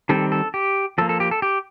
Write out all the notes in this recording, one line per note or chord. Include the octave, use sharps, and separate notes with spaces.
D#3 G3 C4 A4
A4
G4
F3 A#3 A4
A4
G4
A4
G4